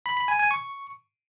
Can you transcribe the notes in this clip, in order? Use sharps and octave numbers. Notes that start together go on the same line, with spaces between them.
B5
B5
G#5
G#5
C#6